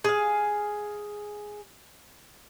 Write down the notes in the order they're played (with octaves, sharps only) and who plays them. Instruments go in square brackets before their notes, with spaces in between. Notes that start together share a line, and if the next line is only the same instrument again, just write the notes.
[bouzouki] G#4 F5